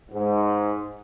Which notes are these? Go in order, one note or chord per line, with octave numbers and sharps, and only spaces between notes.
G#2